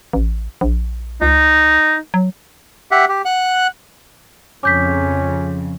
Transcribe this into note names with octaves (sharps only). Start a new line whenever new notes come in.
A1
A#1
C#2 D#4
F#3
G4 E5 F#5
G4
F#5 F#6
F2 C#3 C#4 D6 G6 B6